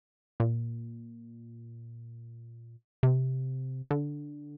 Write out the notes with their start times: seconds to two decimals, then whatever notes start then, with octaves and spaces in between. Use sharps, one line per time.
0.40 A#2
3.03 C3
3.91 D3